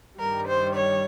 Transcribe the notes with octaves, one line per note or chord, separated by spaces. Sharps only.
G2 D#3 G3 A#4
C5
C#5